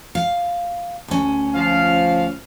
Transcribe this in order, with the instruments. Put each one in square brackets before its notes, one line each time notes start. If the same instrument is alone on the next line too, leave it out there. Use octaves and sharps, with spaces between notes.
[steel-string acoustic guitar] F5
D2 C#4
[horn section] F3 F5